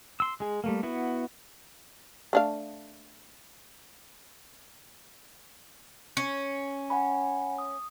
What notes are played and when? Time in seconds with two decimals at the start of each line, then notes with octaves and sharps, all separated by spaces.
0.20 C6 E6
0.40 G#3 G#4
0.64 G3 A3 A#3
0.83 B3 E4 F#4
2.33 A3 D4 F5
6.17 C#4
6.90 F#5 G#5 B5
7.59 D#6